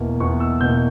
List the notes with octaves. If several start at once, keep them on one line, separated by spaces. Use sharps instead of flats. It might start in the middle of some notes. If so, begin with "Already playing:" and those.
Already playing: E2 B2 A#3
E2 C#6
E6
B2 A#3 G6